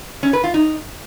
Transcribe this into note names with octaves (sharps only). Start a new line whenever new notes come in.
C#4
B4
F4
D#4